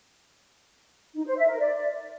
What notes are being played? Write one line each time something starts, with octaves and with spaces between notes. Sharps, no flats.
D#4
C5
E5
A#4
D5